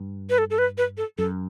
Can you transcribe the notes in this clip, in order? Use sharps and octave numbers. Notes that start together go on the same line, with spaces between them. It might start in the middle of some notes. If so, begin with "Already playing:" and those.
Already playing: G2
B4
A4
A4
B4
B4
A4
F#2 A4